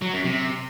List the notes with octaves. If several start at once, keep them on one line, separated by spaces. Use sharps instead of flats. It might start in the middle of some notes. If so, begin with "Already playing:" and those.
F#3
F#2
C3